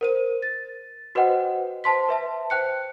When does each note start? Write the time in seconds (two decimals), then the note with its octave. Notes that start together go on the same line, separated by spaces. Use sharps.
0.01 A#4 C5 D#7
0.42 A6
1.15 F#4 B4 C5 D#5 F#5 G5
1.84 C5 A5 C6 B6
2.09 B4 E5 A5
2.50 C5 G5 F#6 C#7